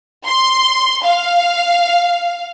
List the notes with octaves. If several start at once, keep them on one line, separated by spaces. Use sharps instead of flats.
C6
F5